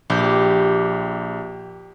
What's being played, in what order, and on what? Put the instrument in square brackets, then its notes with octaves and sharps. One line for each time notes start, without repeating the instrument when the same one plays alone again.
[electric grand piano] A#1 G6 [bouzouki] G4